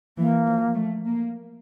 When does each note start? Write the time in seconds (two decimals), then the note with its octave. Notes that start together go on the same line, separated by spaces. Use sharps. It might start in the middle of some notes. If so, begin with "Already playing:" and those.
0.18 E3 A#3
0.47 F3
0.75 A3
1.05 A#3